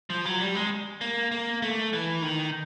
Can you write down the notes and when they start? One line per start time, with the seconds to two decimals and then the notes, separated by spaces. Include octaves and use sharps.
0.10 F3
0.25 F#3
0.40 G3
0.55 G#3
1.01 A#3
1.31 A#3
1.62 A3
1.93 E3
2.22 D#3